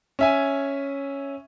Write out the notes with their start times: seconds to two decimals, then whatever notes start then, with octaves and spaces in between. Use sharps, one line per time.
0.19 C#4 E5 G#5